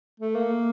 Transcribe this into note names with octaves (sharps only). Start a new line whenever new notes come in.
A3
A#3